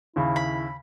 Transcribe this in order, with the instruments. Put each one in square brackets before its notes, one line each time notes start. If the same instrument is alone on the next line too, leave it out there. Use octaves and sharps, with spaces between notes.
[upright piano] D#2 C#3 [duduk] E4
[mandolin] B5